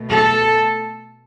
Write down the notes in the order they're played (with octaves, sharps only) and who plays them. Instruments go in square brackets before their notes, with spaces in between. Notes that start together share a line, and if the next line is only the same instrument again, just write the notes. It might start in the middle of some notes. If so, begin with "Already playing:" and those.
Already playing: [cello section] B2 A3
A4